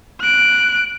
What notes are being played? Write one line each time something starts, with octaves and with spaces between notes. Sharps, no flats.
F#6 D7